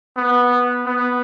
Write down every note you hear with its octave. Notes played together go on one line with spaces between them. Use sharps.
B3
B3